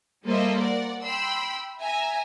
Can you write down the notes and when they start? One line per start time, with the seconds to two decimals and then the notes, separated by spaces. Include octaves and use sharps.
0.24 G3 A#3 A4 C5 D#5 E5
0.57 A#4 D5 F#5
1.02 G5 B5 C6 E6
1.81 E5 G#5 A#5